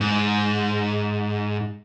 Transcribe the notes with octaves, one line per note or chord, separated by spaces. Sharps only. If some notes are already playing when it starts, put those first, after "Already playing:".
G#2